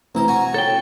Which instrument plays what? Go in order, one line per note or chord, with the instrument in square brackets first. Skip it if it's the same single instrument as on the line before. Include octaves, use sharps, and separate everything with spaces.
[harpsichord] A1 C5 [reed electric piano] C4 E4 [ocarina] A#5
[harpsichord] F#4 G#5
[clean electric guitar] A4 G5 [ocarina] C#5